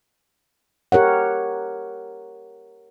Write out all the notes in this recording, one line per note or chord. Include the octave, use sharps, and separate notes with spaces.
G4 A#4 C#5 F#5